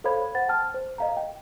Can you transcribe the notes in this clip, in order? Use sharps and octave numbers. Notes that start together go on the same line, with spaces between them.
A4 C5 C#5 F5 B5 G#6
C5 F#5 A6
G5 A5 F6
C5
D#5 F5 A#5
G5